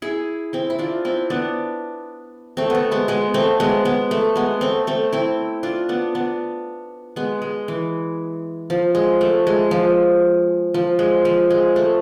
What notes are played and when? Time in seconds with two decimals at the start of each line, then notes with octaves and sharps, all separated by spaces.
0.02 E4 G#4
0.53 C4 E4
0.70 E4
0.79 D4 F4
1.05 C4 E4
1.30 B3 D4
2.57 A3 C4
2.70 A3 B3
2.91 G#3 B3
3.08 G#3 B3
3.34 A3 C4
3.60 G#3 B3
3.85 G#3 B3
4.11 A3
4.36 G#3 B3
4.61 A3 C4
4.87 A3 C4
5.13 C4 E4
5.63 D4 F4
5.89 B3 D4
6.15 B3 D4
7.16 G#3 B3
7.42 G#3
7.68 E3
8.70 F3
8.95 G#3
9.21 A3
9.47 G#3
9.71 F3
10.74 F3
10.99 G#3
11.25 F3
11.50 G#3
11.76 A3